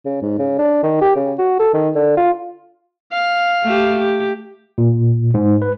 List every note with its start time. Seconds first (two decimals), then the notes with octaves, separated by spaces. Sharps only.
0.05 C#3
0.22 G#2
0.39 C#3
0.59 D4
0.83 D#3
1.01 G4
1.16 C#3
1.39 F#4
1.59 A4
1.74 D#3
1.95 D3
2.17 F4
3.12 F5
3.64 A3 G4
3.99 G4
4.78 A#2
5.34 G#2
5.62 B4